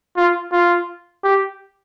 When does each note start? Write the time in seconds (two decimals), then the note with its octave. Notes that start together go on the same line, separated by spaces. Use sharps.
0.17 F4
0.53 F4
1.24 G4